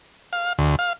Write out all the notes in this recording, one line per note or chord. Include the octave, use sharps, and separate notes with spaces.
F5
D2
F5